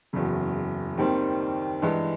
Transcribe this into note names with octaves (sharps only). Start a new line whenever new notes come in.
F#1 E2 C#3 F#3
D#2 D#3 G3 C4
G2 E3 G#3